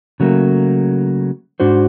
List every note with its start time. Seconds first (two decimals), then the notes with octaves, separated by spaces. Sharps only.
0.20 C#3 F#3 A3 A#3
1.60 G#2 D4 F#4 C5